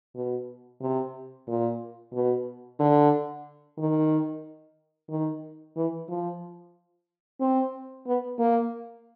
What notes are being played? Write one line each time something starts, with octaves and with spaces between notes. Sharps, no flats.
B2
C3
A#2
B2
D3
D#3
D#3
E3
F3
C4
B3
A#3